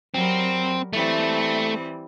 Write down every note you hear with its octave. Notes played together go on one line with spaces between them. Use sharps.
F#3 G3 C4 A#4
E3 G3 A3 C4